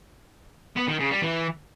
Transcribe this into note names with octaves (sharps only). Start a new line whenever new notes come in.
B3
D#3
C#3
G3
E3